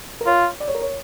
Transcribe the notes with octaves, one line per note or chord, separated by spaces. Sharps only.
A#4
F4 C#5
D5
C#5
A#4
C#5